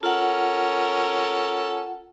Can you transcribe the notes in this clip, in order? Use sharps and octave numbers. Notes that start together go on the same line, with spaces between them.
C#4 F4 A4 A#4 F#5